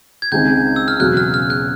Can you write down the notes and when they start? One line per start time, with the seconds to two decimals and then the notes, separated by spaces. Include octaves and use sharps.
0.22 G#6
0.32 C#2 C3 D#3 G#3 C4 G6
0.76 E6
0.88 F6
0.99 E1 E2 C#3 F#3 F#6
1.17 F6
1.34 F6
1.50 F#6